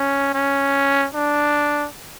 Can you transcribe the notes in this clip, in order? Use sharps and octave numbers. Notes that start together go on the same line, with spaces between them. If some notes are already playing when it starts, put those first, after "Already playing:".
Already playing: C#4
C#4
D4